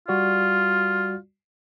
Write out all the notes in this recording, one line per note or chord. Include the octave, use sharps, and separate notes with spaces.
G3 F4 F#4 D5